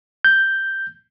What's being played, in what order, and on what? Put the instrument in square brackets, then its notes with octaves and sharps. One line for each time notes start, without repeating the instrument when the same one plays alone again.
[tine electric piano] G6